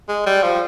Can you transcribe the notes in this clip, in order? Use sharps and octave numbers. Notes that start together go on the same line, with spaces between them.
G#3
G3
F3